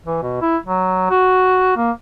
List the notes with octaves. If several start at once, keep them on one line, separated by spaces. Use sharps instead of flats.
E3
B2
E4
F#3
F#4
A#3